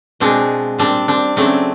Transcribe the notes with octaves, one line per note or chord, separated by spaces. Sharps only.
B2 G#3 C4 D4
A#2 G3 C4 D4
C4 D4
C#3 F#3 A3 C4 D4